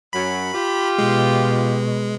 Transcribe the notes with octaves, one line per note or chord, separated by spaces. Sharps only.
F#2 F#3 B5
F4 G4
B2 G#3